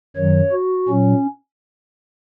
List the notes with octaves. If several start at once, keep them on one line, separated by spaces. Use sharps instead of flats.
F#2 D#3 F#3 C#5
F#4
A#2 F#3 C#4